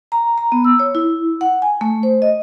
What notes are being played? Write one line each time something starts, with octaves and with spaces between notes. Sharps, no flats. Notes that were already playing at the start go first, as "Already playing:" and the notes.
A#5
A#5
B3
E6
C#5
E4
F#5
G#5
A3
C5
D#5